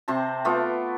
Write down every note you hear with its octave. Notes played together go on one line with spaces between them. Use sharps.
C3 C4 C5 A5
A3 B3 F4 D6